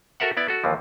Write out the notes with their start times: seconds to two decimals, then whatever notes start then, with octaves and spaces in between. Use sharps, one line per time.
0.20 F#4 A4 A#4 E5 F#5
0.37 B3 E4 D5
0.48 F#4 A4
0.64 D#2 E3 F3